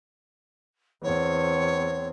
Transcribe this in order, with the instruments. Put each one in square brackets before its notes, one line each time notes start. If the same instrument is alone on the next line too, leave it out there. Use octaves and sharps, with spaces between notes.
[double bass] E2 C4 [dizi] C#5